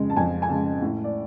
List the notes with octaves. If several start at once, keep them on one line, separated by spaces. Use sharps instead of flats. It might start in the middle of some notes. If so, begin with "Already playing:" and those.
Already playing: F2 C#3 G#3
A5
F2 G#5
G#5
C#3 G#3 A5
A2
D5